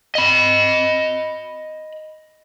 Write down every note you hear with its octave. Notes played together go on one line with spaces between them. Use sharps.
D#5 B5